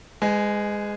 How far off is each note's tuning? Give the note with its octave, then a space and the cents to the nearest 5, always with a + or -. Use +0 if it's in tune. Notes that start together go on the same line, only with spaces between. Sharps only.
G#3 -10 B4 +30 G#5 +15